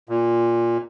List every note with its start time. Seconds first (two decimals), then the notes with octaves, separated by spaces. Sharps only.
0.09 A#2